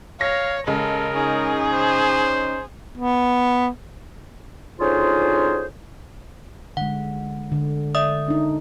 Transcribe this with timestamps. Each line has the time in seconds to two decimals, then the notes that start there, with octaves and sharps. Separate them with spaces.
0.21 C#5 F5 A#6
0.67 C#3 G#3 A4 A#4
1.15 C#4 D#4 G#4
1.73 C5
2.98 B3
4.79 D2 C#4 D#4 F4 G#4 C5
6.77 D3 G#3 F#5
7.52 D3
7.95 D5 E5 D#6
8.28 D4 D#4